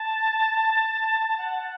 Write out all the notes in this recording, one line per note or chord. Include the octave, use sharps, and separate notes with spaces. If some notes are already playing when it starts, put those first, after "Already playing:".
Already playing: A5
F#5
F#5